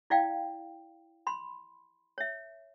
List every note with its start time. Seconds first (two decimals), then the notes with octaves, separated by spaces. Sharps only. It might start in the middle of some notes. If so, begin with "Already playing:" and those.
0.10 E4 D5 F5 G5
1.27 B5 C6
2.18 C#5 E5